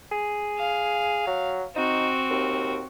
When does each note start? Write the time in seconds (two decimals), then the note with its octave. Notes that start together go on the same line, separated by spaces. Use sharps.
0.12 G#4
0.59 F5
1.27 F#3
1.76 C4 D#4 F#4
2.30 D#2